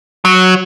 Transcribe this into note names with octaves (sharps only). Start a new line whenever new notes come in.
F#3